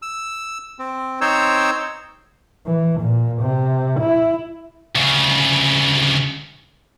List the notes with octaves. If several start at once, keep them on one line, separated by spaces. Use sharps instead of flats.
E6
C4
C4 D#4 C5 C#5 E6
E3
A#2
C3
E4
D2 C#3